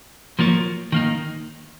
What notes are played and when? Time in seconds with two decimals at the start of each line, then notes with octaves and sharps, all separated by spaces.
0.39 F3 A#3 F4 A#4 C#5
0.92 D#3 A#3 D#4